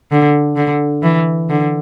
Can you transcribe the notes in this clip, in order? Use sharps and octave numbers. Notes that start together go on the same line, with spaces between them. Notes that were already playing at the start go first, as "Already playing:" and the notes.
D3
D3
E3
D3